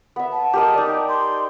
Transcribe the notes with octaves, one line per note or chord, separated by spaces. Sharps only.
B3 E5
A5
G4 A#4 D#5
D#4 D5
C6